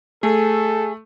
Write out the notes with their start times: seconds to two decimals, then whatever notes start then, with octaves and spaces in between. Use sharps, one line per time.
0.23 A3 G#4 A4